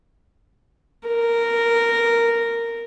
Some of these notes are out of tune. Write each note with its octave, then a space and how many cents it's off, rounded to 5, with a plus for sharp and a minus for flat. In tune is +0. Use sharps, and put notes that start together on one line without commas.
A#4 -10